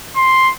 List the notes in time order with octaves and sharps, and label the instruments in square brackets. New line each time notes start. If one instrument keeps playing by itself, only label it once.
[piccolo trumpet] C6